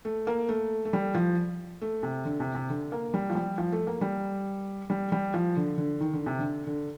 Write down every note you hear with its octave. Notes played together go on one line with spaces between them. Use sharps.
A3
A#3
A3
A3
G3
F3
A3
C3
D3
C3
C3
D3
A#3
G3
F3
G3
F3
A3
A#3
G3
G3
G3
F3
D3
D3
D#3
D3
C3
D3
D3